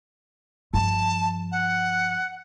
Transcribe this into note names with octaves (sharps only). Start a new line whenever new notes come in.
G2 F3 A5
F#5